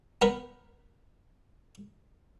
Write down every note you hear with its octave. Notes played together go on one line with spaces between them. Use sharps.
B3 A#4 B4